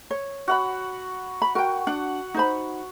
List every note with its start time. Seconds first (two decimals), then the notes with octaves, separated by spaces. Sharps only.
0.11 C#5
0.48 F#4 F#5 B5
1.42 B5
1.55 F#4 A#4 G5
1.87 D4 F#5
2.34 D#4 C5 B5